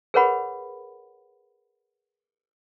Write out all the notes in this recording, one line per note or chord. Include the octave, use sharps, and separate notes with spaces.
G#4 A#4 B4 C#5 F#5 B5